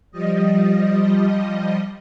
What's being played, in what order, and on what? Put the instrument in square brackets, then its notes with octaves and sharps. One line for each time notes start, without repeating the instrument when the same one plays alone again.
[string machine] F3 G3 D#5